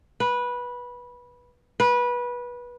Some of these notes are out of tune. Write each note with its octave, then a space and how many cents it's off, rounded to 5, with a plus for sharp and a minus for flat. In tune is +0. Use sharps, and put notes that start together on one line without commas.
B4 -15
B4 -20